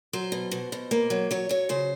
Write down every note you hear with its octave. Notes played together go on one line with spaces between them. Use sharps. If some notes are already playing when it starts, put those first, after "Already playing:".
F#3 C5
B2
B2
B2
A#3
F#3
F#3 C#5
F#3 C#5
C#3 C5